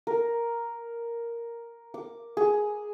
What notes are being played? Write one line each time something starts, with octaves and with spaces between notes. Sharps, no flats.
A#4
D6
G#4